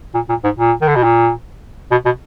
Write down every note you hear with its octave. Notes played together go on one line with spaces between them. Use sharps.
A#2
A#2
G#2
A#2
D#3
D3
B2
A#2
B2
B2